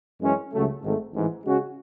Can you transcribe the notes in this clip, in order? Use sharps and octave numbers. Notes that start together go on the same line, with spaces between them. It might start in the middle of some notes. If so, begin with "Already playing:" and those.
F#2 E3 G#3 C#4
C#2 C#3 F#3 A3
G#1 G#2 D#3 A3
A1 G#2 E3
C#3 G#3 C#4 F#4